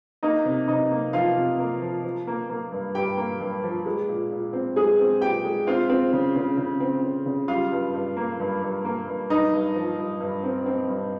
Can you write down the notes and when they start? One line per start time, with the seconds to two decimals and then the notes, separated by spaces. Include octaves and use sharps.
0.23 A#3 D#4 D#5
0.45 C3
0.68 C3 D#4 D#5
0.91 A#3
1.13 F3 F4 F5
1.36 C3
1.59 A#3
1.82 F3
2.04 F3
2.27 A#3
2.50 A#3
2.72 G2
2.95 G2 G4 G5
3.18 A#3
3.40 G2
3.63 F3
3.86 G#3
4.08 A#2
4.30 A#2
4.53 C4
4.76 G#3 G#4 G#5
4.99 C4
5.21 A#2 G4 G5
5.45 G#3
5.67 C4 F4 F5
5.90 C4
6.13 C#3
6.36 C#3
6.57 C#3
6.80 C4
7.03 C#3
7.26 C#3
7.48 G3 F4 F5
7.72 G2
7.94 G2
8.17 A#3
8.40 G2
8.62 G2
8.85 A#3
9.08 G2
9.30 G2 D#4 D#5
9.53 G2
9.75 F3
9.99 G2
10.20 G2
10.43 C4
10.66 C4
10.89 G2